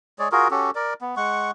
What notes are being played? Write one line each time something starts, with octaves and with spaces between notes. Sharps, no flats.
G#3 G#4 C#5 D5
F4 F#4 G#4 A#4
C#4 F#4 G4 A4
A#4 D5
B3
G#3 F#5 C#6